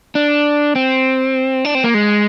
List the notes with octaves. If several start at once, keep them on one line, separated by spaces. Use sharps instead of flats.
D4
C4
D4
C4
A#3
G#3